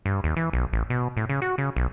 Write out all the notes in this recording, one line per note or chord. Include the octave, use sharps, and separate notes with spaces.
G2
D#2
E3
B1
A1
B2
A2
C#3
F#4
C#3
B1